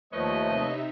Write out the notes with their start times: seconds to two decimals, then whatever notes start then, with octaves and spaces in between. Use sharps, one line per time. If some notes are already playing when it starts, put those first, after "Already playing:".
0.13 D#2 F3 A3 B4 C#5 D#5
0.47 C3 D#4 E5